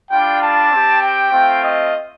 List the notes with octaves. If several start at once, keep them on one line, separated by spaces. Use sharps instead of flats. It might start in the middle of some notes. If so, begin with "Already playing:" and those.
G3 D4 F4 G5
A5
C4 G4
G5
A3 C4 F4
D#5